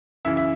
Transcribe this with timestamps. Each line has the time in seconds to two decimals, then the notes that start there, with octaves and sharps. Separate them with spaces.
0.25 F#2 C#3 E3 E4 E5
0.37 E5